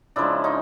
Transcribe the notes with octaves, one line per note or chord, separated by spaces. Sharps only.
C#3 F3 G#3 D4 E4
C#4 D#4